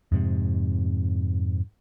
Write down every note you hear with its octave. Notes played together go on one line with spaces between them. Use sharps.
F2 G#2 C3